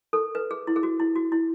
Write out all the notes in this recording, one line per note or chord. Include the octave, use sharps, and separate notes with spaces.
A4
B4
G#4
E4
G#4
F#4
E4
F#4
E4